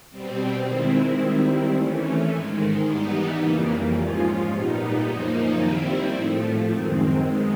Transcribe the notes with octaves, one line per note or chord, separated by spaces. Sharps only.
B2 G3 C4
D#3 G#3 C4 E4
D#3 G3 C4 E4
E3 A3 C#4
G#2 D#3 G#3
E3 G3 B3 D#4
F2 C#3 E3 G3 A#3
G#2 F3 G#3 C#4 F4
A#2 G3 B3 D#4
F#2 C#3 F3 A#3 D#4
D#3 G3 C4 E4
A2 F3 A3
F#2 D#3 G#3 C4
D#3 G#3 B3